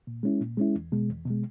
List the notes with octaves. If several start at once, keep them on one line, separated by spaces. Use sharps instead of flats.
A#2
G#3 C#4 E4
A#2
G#3 C#4 E4
E2
B2 G#3
E2
B2 G#3